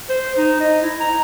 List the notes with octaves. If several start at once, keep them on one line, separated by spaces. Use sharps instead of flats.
C5
D#4
D#5
E4
A#5